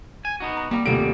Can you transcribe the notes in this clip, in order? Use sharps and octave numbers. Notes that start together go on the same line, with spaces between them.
G#5
B3 D#4 F#4
A#5
G3 A#3 A5 A#5
D#1 C3 G3 A3 A#3 A4 F#5 D7